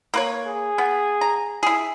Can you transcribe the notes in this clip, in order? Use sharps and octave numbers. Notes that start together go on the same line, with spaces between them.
A#3 B4 C#5
G#4
B3
A#5
E4 G#4